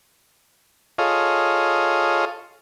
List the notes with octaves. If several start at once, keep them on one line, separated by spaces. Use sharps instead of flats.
F4 G#4 A4 C#5 D#5 F5